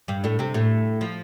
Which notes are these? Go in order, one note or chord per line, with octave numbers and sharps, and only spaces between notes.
G2 G3
A2 A3
C3 C4
A2 A3
F3